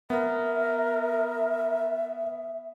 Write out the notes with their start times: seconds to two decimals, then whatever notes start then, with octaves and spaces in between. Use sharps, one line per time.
0.10 B3 A#4 E5